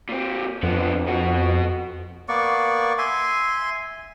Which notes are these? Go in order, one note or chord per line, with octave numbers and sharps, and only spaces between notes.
A#2 C4
F2 D3 B3
B2 F#4
A#3 B3 D5 C#6
E5 G#5 C6